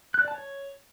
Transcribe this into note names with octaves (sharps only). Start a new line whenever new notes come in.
F#6
D5
A5
C#5